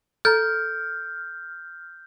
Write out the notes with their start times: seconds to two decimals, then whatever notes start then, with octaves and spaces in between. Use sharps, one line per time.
0.25 A4 A#5 F6 G6